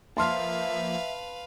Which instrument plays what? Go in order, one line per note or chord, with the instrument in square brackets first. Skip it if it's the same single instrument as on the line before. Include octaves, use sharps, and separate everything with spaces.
[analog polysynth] F3 A#3 [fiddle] B4 F5 [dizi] E5 [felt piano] A5 C6 F6